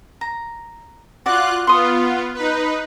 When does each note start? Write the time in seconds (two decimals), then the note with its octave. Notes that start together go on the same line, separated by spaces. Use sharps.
0.21 A#5
1.26 F4 F#4 D5 D6 F#6
1.67 B3 F4 C6 D#6
2.34 D#4 B4